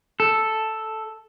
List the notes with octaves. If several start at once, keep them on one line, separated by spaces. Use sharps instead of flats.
A4